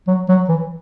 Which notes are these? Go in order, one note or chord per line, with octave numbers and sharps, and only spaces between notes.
F#3
F#3
E3